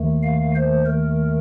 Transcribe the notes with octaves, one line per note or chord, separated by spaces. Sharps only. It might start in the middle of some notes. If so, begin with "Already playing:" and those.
Already playing: D#2 D#3 A3
F5
C5
A#4